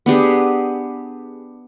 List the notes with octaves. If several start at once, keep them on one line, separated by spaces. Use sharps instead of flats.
B3 D4 G4 G#4